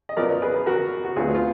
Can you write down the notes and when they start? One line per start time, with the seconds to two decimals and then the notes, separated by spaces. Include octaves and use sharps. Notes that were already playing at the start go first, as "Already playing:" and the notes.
0.09 D#5
0.17 F#2 F3 B3 A#4 D5
0.42 G#4 B4
0.66 F#4 A#4
1.05 F#4
1.16 D2 D3 F#3 B3 F4 G#4
1.34 F4